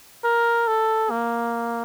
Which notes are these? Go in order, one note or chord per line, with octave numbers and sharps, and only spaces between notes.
A#4
A4
A#3